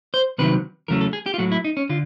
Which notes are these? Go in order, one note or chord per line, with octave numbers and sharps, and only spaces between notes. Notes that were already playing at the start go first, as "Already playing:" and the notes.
C5
C2 C3 D#3 F#3 B4
E2 C#3 F#3 A3 A#4
A4
G#4
G4
F4
A2 F#3 A3 F#4
E4
D#4
C#4
D3 F4